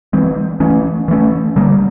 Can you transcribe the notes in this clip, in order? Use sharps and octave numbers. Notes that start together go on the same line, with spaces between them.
E3 G#3 C4
E3 A3 C#4
E3 A3 C#4
D3 G3 A#3